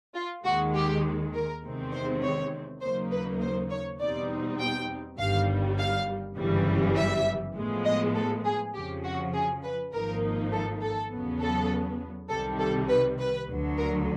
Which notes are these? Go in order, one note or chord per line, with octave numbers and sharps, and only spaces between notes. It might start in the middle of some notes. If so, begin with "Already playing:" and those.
F4
D#2 D#3 G#3 F#4
G4
A#4
E2 C3 D#3 G#3 C4
C5
C#5
D#2 C#3 F#3 A#3 D#4 C5
B4
C5
C#5
E2 B2 G3 C4 D#4 D5
G5
G1 G2 D#3 G3 F5
F5
G1 F#2 C#3 E3 G3
E5
A2 F3 G#3 B3
D#5
A4
G#4
F2 C#3 F3 G4
F#4
G#4
B4
G#1 G#2 F3 A#3 D#4 A#4
A4
A4
E2 C#3 F#3 B3
A4
C2 C3 D#3 G3 A4
A4
B4
B4
D2 D3 F#3
A#4